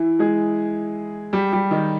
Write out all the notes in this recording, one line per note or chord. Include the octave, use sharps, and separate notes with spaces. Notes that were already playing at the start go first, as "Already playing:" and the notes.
Already playing: E3 E4
G#3 G#4
G3 G4
G3 G4
D#3 D#4